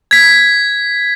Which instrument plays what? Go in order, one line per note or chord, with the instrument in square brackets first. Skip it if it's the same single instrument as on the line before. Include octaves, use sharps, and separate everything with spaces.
[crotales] G#6 B6